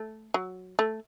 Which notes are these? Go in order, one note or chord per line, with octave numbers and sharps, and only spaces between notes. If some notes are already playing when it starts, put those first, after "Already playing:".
Already playing: A3
F#3
A3